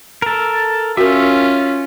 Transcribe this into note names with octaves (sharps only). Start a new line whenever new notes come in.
A4 A#4
C#4 F4 F#4 A#4 E5